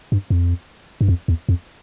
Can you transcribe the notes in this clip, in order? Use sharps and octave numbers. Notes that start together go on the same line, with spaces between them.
G2
F2
G2
F2
E2
F2